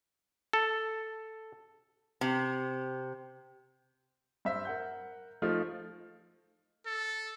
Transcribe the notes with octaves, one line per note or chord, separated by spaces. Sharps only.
A4
C3
G2 C5 E5
A#4 F#5 G6
F3 A3 D#4 F4 F6
A4